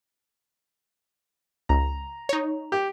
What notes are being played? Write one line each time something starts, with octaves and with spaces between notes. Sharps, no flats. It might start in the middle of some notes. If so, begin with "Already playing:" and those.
C#2 A#5
D#4 C#5
G4